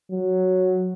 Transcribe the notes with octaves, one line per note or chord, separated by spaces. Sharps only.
F#3